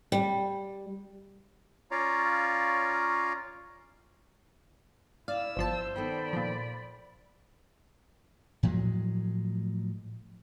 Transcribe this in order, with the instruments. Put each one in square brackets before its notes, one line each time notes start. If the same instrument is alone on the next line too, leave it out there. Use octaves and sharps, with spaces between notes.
[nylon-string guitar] G3
[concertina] C#4 F4 C#5 D5 F5 A#5
[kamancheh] E4 E6 [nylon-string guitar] D5 [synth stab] F5
[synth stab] G1 F3 A5 [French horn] C5
[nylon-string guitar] D#3 B3 A4 [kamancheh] D5 B5
[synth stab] A#2 F3
[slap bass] A2 F3 F#3 G#3